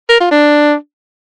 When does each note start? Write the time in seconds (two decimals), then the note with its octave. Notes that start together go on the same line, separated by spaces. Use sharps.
0.09 A#4
0.20 F4
0.31 D4